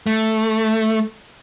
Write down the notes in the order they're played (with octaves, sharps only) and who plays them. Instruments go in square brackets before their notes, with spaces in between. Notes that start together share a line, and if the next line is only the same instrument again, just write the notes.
[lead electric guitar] A3